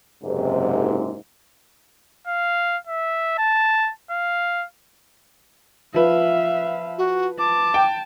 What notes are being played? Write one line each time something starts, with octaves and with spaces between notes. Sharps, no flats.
F#1 G#2 C3
F5
E5
A5
F5
F3 B4 E5 F5
F#4
A5 D6
G5